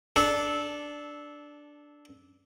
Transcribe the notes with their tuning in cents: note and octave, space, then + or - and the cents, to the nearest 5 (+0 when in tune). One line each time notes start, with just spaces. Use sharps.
D4 +0 A4 -15